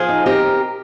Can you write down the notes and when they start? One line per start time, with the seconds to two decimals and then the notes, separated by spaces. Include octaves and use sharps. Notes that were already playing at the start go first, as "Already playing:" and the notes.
Already playing: F3 F4 G#4
0.09 D#4
0.26 C4 G4 A#4